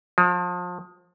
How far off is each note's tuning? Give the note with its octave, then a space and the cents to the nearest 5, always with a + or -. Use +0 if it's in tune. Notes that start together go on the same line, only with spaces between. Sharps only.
F3 +35